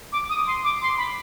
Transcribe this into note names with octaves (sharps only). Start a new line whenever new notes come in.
D6
D#6
C6
D6
C6
B5